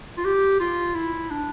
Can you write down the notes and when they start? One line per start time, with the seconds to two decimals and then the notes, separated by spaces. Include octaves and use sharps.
0.17 F4
0.25 G4
0.60 F4
0.95 E4
1.31 D4